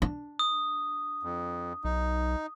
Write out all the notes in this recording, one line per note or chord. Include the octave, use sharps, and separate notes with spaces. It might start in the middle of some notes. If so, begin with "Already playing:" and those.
D4
D#6
F2
B1 D#4